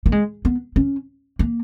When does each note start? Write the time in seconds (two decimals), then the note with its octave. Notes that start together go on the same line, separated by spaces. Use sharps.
0.06 A#3
0.12 G#3
0.45 B3
0.76 C#4
1.39 A#3